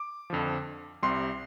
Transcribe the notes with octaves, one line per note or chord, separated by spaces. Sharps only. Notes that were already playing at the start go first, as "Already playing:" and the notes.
Already playing: D6
F2 D3 F3
C2 C3 G3 C6